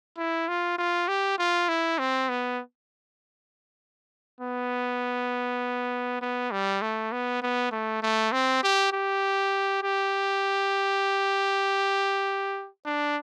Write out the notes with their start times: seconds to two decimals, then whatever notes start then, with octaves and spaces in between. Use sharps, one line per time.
0.18 E4
0.48 F4
0.78 F4
1.08 G4
1.39 F4
1.68 E4
1.99 C4
2.29 B3
4.41 B3
6.21 B3
6.51 G3
6.82 A3
7.12 B3
7.42 B3
7.72 A3
8.03 A3
8.32 C4
8.63 G4
8.93 G4
9.83 G4
12.85 D4